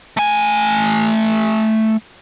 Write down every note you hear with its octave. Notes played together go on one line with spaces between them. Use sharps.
A3 G#5